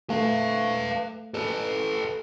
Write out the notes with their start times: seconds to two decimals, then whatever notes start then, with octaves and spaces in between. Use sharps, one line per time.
0.10 A3 B4 F5
1.34 A4 B4